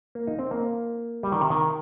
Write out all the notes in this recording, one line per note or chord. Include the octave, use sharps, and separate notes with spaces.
A#3
D#4
C4
A#3
G3
D#3
C3
D#3